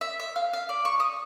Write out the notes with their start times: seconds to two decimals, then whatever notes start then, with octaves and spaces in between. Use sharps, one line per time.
0.01 E5
0.20 E5
0.36 F5
0.53 F5
0.69 D5
0.85 C#6
1.00 D#6